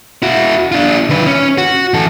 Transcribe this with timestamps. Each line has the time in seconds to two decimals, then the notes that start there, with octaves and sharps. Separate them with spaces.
0.22 E4 F#4
0.72 D4 F4
1.09 D#3 B4
1.26 C#4
1.58 F#4
1.94 E3 A4